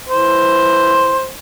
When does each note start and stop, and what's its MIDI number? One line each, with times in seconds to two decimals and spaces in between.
0.09 1.28 52
0.09 1.28 72